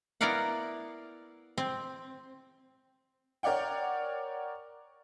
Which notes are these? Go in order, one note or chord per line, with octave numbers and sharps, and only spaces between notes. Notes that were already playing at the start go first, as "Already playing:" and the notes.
B3 E4 A#4 D5 F5 F#5
C4
A#4 C#5 D5 F#5 G5